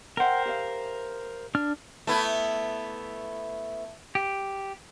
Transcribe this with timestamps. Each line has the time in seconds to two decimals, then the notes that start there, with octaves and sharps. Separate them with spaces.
0.17 A#4 C5 E5 F#5 G5
0.46 G4 E5 F5
1.55 D4 F6
2.07 A3 B3 E4
4.15 G4